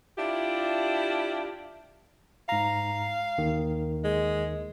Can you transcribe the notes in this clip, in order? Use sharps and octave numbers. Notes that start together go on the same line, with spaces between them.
D4 E4 F4 G4
G#2 F5 A#5
D#2 D#3
G#3